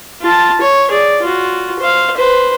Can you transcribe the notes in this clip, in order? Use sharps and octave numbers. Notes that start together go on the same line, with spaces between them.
F4 A5
C#5
G#4 D5
F4 F#4
C5 F5
B4 C5